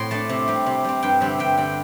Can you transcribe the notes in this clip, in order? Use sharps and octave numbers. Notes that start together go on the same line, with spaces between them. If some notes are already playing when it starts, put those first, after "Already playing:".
Already playing: A2 C4 C6
A3 D4 A5
C3
G3 C4
C3
G3 C4
G2 G5
D3 G3 C4 E5
G2 G5
D3 G3 C4 G5